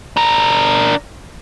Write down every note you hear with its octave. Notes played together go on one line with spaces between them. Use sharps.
D4 A#4